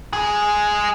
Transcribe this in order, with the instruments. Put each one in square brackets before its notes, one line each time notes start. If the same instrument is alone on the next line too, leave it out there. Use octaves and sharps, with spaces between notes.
[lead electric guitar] G#3 G#4